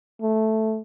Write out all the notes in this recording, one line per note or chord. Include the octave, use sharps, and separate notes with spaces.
A3